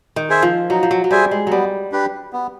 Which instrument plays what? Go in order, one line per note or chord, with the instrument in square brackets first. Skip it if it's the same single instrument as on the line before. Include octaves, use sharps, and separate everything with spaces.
[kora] D#3
[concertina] G#4 C5 E5 G#5
[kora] F3
[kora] F#3 [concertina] D#4
[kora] F3
F#3
F#3
[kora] G3 [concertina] G#4 C5 E5 G#5
[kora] G#3
[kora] F#3 G3 [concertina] B3
[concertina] D4 G4 B4
B3